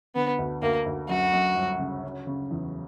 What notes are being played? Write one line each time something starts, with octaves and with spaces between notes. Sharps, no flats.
D3 B3
D2
D2 A#3
D2
F#2 F#4
F#2
G1
C#3
C#4
C#3
E2